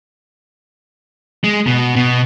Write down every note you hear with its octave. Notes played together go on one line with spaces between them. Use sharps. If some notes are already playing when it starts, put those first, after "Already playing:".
G#3
B2
B2